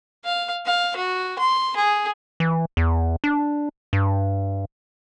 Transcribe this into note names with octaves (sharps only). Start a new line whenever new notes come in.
F5
F5
F#4
C6
G#4
E3
E2
D4
G2